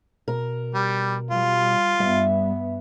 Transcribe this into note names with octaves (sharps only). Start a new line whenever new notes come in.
B2 A#4
G3
G3 F4
G2 G3 B3 E5